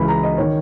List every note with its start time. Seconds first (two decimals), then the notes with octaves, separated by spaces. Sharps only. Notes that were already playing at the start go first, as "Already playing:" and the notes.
Already playing: C#2 C#3 E3 B5
0.08 A#5
0.23 D#5
0.38 D#3 C#5